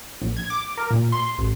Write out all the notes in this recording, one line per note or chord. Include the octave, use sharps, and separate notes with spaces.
A#1
G#6
D6
A#4
A#2
C6
A1